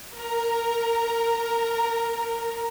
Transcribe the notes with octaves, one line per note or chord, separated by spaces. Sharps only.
A#4 A#5